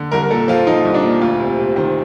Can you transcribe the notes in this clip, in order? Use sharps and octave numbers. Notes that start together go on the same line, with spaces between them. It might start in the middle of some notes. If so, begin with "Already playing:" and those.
Already playing: D3
C2 A#4
A#4
A#2 A4
F3 F4
F3 D#4
C2
D4
A#2
D2 F4
C3
C3
D#3 C5